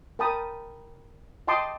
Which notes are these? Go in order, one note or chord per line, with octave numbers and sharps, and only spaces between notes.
A#4 G5 A5 B5 D#6
D#5 G5 A5 C6 D6 D#6